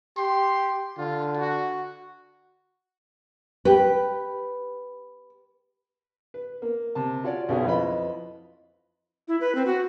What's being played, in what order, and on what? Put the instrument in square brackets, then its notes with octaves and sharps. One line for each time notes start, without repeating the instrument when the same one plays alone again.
[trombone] G4 [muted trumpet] C6
[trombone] D3 [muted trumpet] F4
[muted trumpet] F#4
[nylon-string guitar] G4 B4
[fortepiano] B4
A#3
C3 A5
C#4 F4 F#4 C#5 D5
B1 F#2 B2 B3 G#4 C#5
F2 E4 F4 B4 D#5 B5
[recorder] E4
B4
C4
F#4